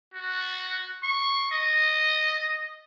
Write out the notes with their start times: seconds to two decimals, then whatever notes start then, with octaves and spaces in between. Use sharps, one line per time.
0.14 F#4
1.03 C#6
1.51 D#5